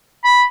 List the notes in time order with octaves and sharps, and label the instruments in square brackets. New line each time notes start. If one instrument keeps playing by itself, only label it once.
[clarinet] B5